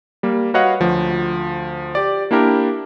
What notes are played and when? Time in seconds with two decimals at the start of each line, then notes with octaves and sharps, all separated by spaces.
0.23 G3 A#3
0.54 F#4 B4 C#5 D#5 F5 F#5
0.80 D2 F3
1.95 G4 D5
2.31 A#3 D4 E4 G4 A#4